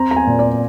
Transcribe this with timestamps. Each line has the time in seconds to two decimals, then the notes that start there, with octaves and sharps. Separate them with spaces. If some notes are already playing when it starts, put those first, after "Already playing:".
Already playing: C4 A#5
0.11 A#5
0.16 G#5
0.27 A#2
0.39 D5